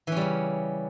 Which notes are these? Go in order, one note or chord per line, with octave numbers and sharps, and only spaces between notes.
C#3 E3 G3 C#4